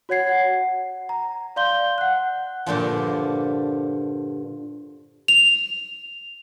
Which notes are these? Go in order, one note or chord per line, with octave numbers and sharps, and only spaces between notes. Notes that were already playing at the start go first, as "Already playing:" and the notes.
F#4 C#5 F#5 G#6 C7
F#5
A#5
D5 F5 C6 G6 G7
F#5 F#6
G2 A#2 D3 F3
F7